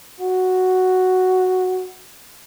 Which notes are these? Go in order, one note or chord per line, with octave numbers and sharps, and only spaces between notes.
F#4